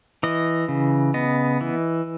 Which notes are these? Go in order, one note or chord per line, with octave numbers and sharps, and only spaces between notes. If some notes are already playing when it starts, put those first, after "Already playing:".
E3 D#5
C#3
B3 D#5
E3